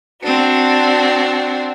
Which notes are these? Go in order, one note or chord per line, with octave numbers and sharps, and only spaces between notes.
C4 D4 F#4